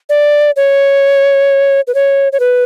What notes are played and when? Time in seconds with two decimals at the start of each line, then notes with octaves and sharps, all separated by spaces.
0.09 D5
0.56 C#5
1.87 B4
1.95 C#5
2.33 C#5
2.40 B4